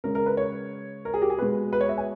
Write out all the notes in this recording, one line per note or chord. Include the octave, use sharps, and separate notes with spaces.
C#3 G#3 A#4
A#4
B4
C#5
A#4
G#4
G4
G#4
B2 G#3 B4
B4
C#5
E5
G#5